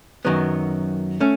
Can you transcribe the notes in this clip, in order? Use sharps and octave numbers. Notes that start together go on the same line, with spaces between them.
F#2 D#3 F#3 B3
A3 C#4